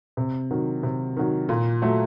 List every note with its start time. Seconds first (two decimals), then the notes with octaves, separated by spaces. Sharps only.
0.17 C3
0.51 D#3 F#3
0.83 C3
1.17 D#3 F#3
1.49 A#2
1.82 F#3 A3